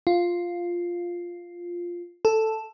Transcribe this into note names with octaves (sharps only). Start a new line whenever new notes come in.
F4
A4